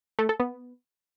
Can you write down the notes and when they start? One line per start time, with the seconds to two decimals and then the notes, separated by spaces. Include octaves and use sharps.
0.19 A3
0.29 A4
0.40 B3